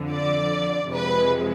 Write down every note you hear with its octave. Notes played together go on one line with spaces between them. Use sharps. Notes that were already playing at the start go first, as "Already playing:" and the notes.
Already playing: F2 D3 F3
D5
F2 C3 F3 G#3 B4